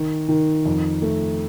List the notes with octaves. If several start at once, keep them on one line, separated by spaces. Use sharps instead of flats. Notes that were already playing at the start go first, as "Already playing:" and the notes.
Already playing: D#3
D#3
F2
A3